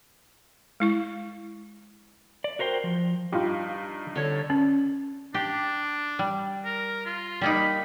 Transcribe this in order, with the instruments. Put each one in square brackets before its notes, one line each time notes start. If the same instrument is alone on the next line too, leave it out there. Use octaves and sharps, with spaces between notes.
[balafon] G#3 E4 C#6
[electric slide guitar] D5
F#4 A#4 C5 E5 G5
F3
[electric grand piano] G2 D#4 [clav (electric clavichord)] F4 G4
[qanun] D3 C#5
[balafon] C#4
[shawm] D4 [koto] G4
[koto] G3
[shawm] A#4
F4
[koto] G3 A#3 D#4 [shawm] B5